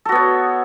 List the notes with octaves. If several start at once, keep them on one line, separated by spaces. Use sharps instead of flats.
B3 F#4 A4 C#5